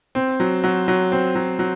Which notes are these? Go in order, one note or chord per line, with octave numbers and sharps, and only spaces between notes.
C4
F#3
F#3
F#3
C4
F#3
F#3